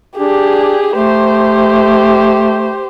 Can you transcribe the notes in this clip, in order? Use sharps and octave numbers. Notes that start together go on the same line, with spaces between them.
D4 G4 G#4
A3 G4 C5